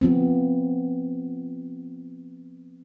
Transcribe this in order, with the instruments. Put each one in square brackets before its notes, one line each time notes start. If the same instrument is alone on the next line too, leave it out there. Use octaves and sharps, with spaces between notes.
[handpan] F3 B3 C4